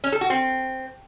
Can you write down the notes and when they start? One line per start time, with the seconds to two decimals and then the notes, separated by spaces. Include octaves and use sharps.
0.04 C#4
0.12 A4
0.21 F#4
0.30 C4